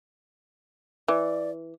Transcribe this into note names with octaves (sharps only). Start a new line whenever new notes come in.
E3 D5